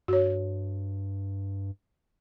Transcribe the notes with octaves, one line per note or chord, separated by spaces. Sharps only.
G2 F#4 C#5